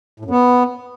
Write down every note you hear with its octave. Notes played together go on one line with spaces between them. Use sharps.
A2
F#2
B3